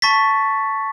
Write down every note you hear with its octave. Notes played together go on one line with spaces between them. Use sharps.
A5 C#6 A6 B6